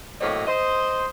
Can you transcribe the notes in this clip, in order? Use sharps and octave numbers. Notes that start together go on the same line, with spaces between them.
A2 F#3 A#3 C4 C#5 D#5
C5 D#5